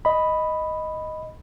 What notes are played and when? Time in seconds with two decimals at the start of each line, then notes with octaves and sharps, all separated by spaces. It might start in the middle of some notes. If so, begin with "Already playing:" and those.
0.05 D#5 B5